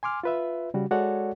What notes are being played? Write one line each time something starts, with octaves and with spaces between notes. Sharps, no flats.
G#5 C6 D6 F6
F4 B4 E5
C#3 G3 F#4
G#3 F#4 A4 C#5 D5 F#5